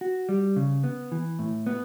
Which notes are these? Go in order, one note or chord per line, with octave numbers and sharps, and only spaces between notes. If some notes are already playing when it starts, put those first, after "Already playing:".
F#4
G3
C#3
B3
E3
A2
B3